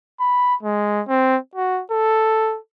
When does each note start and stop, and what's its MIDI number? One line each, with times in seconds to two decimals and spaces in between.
0.20 0.55 83
0.63 1.02 56
1.09 1.37 60
1.55 1.82 66
1.91 2.58 69